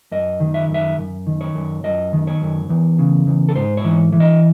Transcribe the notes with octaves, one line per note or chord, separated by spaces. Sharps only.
F#2 D#5
D#3
E5
F#2
E5
F#2
D#3
C#5
F#2
F#2 D#5
D#3
C#5
F#2
E2
C#3
E2
A4
G#2 C5
C#5
E3
E3
D#5